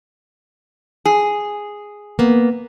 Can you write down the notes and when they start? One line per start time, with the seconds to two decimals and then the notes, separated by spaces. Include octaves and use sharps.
1.05 G#4
2.19 A#3 B3